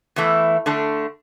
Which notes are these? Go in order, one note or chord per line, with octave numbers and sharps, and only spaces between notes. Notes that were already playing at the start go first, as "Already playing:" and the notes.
E2 E3 A3 E4
D3 A3 D4